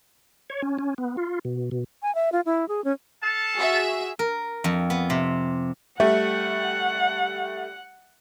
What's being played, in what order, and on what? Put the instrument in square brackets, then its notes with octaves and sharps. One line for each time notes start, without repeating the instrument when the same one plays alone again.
[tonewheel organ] C#5
C#4
C#4
B3
F4
B2
B2
[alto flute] G#5
E5
F4
E4
G#4
C#4
[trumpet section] A4 F5 A5
[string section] F#4 G#4 E5
[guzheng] A#4
F2
B3
C3
[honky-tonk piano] G3 A3 [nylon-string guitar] E5 [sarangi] F#5